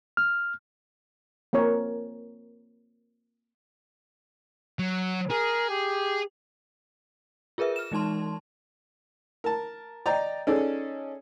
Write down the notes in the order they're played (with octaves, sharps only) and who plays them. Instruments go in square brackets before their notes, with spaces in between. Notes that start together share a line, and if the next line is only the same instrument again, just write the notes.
[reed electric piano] F6
[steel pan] A#3 C4 A#4 C#5
[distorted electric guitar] F#3
[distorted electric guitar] G#4 [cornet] A#4
[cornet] G4
[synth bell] F4 G#4 A#4 B4 E5
F6 E7
E3 G#3 D#4 A5 C6
[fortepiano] A#4 A5
D5 D#5 G5 A#5
C#4 D#4 G#4 A4 D5